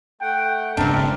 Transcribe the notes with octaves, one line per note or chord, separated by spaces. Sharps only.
A3 F#5 G5
F#1 G#2 C#3 C4 D4 A#4 E5